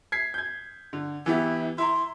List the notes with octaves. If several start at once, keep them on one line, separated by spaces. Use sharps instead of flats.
G#6 B6 C7
G6 G#6
D3
E3 B3 E4 G4
E4 A#5 C6